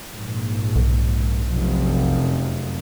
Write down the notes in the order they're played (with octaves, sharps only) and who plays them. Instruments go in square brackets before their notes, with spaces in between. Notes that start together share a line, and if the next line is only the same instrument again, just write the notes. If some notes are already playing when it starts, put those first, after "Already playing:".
[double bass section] A#1 G#2
[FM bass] B1
[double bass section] F1 F#2 F3